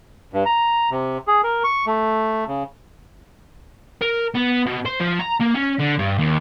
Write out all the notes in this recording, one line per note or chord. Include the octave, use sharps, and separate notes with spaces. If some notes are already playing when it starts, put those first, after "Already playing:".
G2
A#5
C3
G#4
A#4
C#6
A3
C#3
A#4
B3
B2
C5
F3
A#5
A#3
C#4
D3
G2
D#2